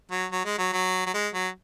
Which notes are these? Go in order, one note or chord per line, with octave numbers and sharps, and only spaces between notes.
F#3
F#3
G#3
F#3
F#3
F#3
G#3
F#3